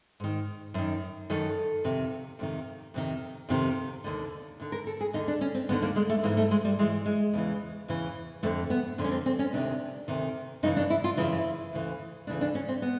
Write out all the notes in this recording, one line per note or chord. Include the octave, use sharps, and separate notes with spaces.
G#2 D#3
F#2 D#3
F#2 D#3 A4
F2 C3 D#3
F2 C3 D#3
F2 C3 D#3
F2 C3 D#3
D#2 D3
D#2 D3
A#4
A4
G#4
D#2 D3 D#4
D4
C#4
C4
D#2 D3 B3
A#3
G#3
A3
G#2 E3 A#3
A3
G#3
G3
G#2 E3 G#3
G#3
E2 C#3 E3
E2 C#3 E3
F2 D3 A3
B3
F2 D3
C#4
C4
C4
C#4
D2 C3 D#3 D4
D2 C3 D#3
F#2 C#3 E3 D#4
D4
E4
F4
F#2 C#3 E3 E4
D2 C#3 E3
D2 C#3 E3 D4
D4
C#4
C4
B3